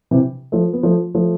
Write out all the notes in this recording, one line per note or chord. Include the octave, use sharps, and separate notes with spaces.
C3 E3
F3 A3
B3
F3 A3
F3 A3